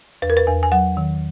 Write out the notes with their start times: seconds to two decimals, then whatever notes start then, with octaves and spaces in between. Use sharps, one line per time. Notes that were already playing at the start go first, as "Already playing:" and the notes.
0.22 E2 B4
0.30 A#4
0.37 B4
0.47 E2 G#5
0.63 G#5
0.72 F#3 F#5
0.97 D#3